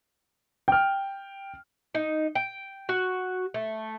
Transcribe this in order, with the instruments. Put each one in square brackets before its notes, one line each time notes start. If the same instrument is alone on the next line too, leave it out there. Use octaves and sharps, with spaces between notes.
[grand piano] G5 F6
[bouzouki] D#4
G5
F#4
A3